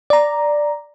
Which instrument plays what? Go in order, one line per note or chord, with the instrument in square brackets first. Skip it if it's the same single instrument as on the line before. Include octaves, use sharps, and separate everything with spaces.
[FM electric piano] D5 A#5